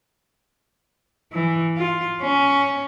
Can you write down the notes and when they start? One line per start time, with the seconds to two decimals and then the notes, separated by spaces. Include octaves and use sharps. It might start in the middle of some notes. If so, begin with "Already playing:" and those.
1.32 E3
1.77 F4
2.22 C#4